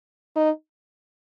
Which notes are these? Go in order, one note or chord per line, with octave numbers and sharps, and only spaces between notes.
D#4